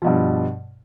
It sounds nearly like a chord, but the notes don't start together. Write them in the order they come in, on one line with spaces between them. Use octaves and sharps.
F3 B2 G2